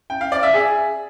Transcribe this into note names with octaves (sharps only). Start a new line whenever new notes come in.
G5
F5
D5
E5
G#4